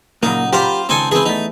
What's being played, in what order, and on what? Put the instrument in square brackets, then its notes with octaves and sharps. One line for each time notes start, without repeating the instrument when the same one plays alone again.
[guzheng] A#2 C#3 F#3 [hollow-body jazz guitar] A#3 [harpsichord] D#4
[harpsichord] F4 C5 [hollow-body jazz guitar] G4 [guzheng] A#4 D5 B5
[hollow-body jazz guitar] C#2 [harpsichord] C4 G5 G#5 [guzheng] D#4 A4
[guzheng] E3 [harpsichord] C4 G#4
[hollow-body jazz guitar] E2 A3 [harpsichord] D#4